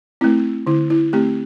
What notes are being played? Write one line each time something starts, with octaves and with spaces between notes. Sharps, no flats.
A3 C4 E4
D3 E4
E4
A3 C4 G4